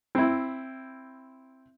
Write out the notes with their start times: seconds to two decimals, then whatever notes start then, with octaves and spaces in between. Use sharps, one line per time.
0.15 C4 E4